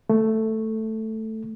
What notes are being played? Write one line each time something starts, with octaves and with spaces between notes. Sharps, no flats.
A3